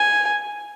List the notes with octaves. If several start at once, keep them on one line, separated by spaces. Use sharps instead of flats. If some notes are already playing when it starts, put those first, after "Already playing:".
Already playing: G#5